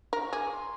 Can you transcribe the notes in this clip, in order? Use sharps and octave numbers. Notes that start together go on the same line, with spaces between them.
A#4
C#6
G#4 D6
C#6
C6